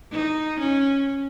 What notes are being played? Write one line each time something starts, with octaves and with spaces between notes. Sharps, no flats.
D#4
C#4